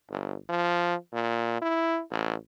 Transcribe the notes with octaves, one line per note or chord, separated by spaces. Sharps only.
G1
F3
A#2
E4
A1